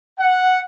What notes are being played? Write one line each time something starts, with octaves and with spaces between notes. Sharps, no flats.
F#5